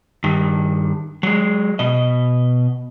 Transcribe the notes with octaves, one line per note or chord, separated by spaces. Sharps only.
G2 D#3
F#3 G#3
B2 D#5